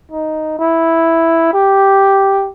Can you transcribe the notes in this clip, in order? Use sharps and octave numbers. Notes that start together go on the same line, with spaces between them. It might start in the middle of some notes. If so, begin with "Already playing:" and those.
D#4
E4
G4